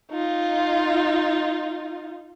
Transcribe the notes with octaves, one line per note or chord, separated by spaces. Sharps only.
D#4 F4